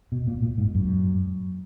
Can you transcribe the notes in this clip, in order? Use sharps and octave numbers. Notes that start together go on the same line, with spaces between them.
B2
A#2
A#2
G#2
F#2